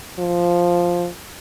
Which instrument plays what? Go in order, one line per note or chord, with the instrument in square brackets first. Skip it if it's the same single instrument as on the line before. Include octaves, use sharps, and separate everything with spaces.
[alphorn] F3